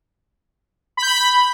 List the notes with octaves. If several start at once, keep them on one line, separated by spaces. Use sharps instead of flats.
B5
G6
B5